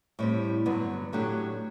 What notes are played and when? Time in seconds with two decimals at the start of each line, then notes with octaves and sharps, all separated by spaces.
0.19 A2 G3 C4
0.66 G2 D3 F#3 B3
1.13 A2 F#3 A3 D4 G4